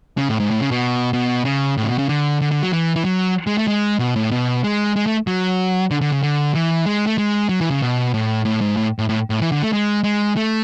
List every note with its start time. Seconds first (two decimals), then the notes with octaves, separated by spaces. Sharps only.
0.18 C#3
0.29 A2
0.40 G#2
0.51 A2
0.61 C#3
0.71 B2
1.13 B2
1.45 C#3
1.77 A2
1.83 C#3
1.88 B2
1.99 C#3
2.09 D3
2.41 D3
2.51 D3
2.63 F#3
2.73 E3
2.96 E3
3.05 F#3
3.47 G#3
3.58 A3
3.68 G#3
3.99 B2
4.16 A2
4.31 B2
4.64 G#3
4.96 G#3
5.06 A3
5.27 F#3
5.91 D3
6.01 D3
6.12 C#3
6.22 D3
6.55 E3
6.86 G#3
7.07 A3
7.18 G#3
7.49 F#3
7.61 E3
7.71 C#3
7.82 B2
8.14 A2
8.45 A2
8.61 G#2
8.77 A2
8.99 A2
9.09 A2
9.30 A2
9.41 E3
9.52 D3
9.62 A3
9.73 G#3
10.04 G#3
10.37 A3